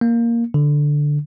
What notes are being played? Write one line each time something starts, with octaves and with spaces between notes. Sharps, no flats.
A#3
D3